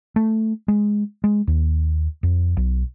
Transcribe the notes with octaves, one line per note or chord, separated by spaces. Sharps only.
A3
G#3
G#3
D#2
F2
B1